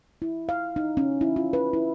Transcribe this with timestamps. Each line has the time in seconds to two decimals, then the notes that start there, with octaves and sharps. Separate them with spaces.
0.22 E4
0.49 F5
0.76 D#4
0.97 C#4
1.21 E4
1.36 F4
1.53 B4
1.73 E4